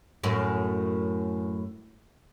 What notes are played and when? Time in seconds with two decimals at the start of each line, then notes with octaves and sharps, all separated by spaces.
0.24 F#2 A2